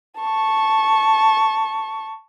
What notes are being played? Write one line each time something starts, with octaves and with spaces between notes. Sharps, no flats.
A5 C#6